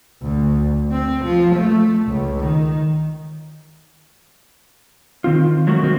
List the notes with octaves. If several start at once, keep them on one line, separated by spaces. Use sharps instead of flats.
D2
C4
F3
A3
C#2
D#3
D#3 C4 F4
F#3 G#3 A3 F#4 A4 A#4
D#3 G#3 C4 F#4